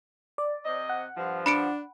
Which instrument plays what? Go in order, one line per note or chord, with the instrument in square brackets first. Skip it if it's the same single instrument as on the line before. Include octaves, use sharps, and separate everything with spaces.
[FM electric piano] D5
[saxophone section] C3 C4 D#5
[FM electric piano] F#5
[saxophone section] G2 F3
[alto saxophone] D4 [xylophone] B5 C#7 D7